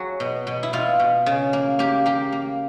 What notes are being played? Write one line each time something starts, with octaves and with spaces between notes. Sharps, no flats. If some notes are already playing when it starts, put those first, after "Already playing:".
Already playing: F#3 F#4 G#4
B2
B2
E4
B2 F4
B2
C#3
A#3
A#3 G4
A#3 G4
A#3